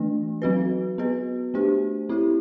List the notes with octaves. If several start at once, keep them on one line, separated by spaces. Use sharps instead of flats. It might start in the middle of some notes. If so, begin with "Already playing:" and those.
Already playing: E3 A3 D4
F#3 C4 F#4 B4
B3 F#4 B4
A3 D4 G4 C5
C4 E4 G4